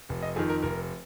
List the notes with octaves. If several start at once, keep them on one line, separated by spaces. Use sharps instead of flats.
F1
D#5
F2 D#3 G#4
A#4
F1 A#4